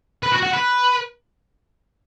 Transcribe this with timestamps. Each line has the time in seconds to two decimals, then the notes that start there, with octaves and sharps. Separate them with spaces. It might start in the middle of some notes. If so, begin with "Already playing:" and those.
0.23 B4
0.32 F#4
0.42 F#4
0.53 B4